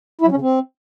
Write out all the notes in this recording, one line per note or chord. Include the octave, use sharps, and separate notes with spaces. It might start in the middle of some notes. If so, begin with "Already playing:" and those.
E4
F#3
C#4
C#3
C4